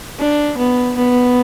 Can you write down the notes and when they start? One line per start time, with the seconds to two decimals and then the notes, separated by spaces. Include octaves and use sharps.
0.19 D4
0.57 B3
0.97 B3